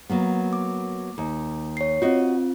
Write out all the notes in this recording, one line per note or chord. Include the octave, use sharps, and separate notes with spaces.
F#3 A#3 B3
D6
D#2
C#5 C7
C4 F4 F#4 D#5